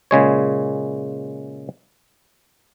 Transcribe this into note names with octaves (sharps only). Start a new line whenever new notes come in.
A#2 C#3 G#3 C#5